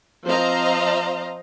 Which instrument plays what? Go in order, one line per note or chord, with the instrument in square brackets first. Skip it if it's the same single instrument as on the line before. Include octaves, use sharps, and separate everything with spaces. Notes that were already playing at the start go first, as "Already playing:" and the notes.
[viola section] F3 C4 C5 D#5 F5 A#5